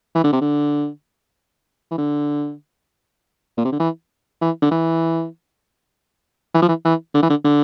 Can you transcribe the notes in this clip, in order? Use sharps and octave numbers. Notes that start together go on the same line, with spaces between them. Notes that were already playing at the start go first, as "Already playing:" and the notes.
E3
D3
C3
D3
E3
D3
A#2
C3
D3
E3
E3
D3
E3
E3
F3
E3
E3
D3
E3
D3
D3